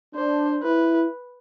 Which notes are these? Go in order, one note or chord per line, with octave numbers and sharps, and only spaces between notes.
D4 C5
E4 B4